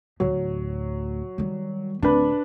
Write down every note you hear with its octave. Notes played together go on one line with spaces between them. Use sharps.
D2 A2 F#3
D#3 G3
D1 C4 D4 B4